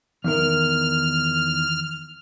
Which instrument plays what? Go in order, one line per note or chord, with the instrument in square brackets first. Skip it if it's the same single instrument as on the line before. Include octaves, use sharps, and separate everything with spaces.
[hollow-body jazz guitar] E2 D#3 A#4 [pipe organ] F6